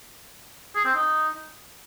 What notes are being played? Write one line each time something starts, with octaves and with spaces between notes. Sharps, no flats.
G#4
C4
D#4